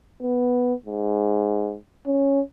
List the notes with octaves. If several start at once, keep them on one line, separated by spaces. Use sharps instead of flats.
B3
G#2
C#4